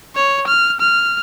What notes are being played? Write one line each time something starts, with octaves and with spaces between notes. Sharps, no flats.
C#5
F6
F6